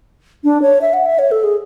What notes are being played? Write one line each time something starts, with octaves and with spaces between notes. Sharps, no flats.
D4
C#5
E5
F#5
E5
C#5
A4
G#4